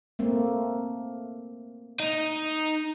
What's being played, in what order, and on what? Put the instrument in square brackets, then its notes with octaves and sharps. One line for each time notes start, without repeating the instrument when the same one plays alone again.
[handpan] A3 A#3 C4
[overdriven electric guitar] D#4